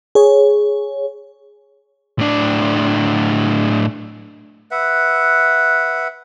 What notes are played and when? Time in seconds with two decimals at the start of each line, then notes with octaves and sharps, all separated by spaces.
0.15 G#4 C#5
2.19 A2 D4
4.71 B4 E5 F#5